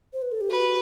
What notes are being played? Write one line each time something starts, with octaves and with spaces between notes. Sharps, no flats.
C5
B4
A4
G4
F#4 B4